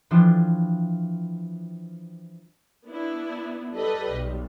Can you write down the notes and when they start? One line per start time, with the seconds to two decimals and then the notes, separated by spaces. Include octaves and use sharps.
0.11 E3 F3 G3 D4 F4
2.87 B3 D4 E4
3.75 G3 A4 B4 D#5
4.13 B1